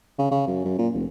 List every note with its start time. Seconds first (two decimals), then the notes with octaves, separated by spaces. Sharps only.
0.19 C#3
0.31 C#3
0.47 F#2
0.65 F#2
0.78 A#2
0.94 F1